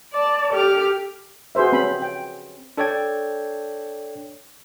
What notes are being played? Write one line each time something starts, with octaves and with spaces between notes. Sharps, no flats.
D5 A5
G4 A4 D6 F6
F#4 G#4 B4 C5 E5
C4 C#4 B5
G5
D4 A4 C#5 D5 G5 G#6